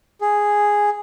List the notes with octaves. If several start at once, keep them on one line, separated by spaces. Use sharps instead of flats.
G#4